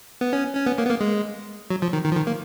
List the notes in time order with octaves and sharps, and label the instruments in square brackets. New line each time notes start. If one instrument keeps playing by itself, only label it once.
[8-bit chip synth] B3
C#4
C#4
B3
A#3
B3
A#3
G#3
F#3
F3
D#3
D#3
F3
D#3
A#3